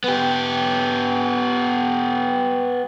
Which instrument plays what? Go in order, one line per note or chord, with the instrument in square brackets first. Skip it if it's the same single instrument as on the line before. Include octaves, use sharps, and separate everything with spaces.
[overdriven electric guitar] B3 G4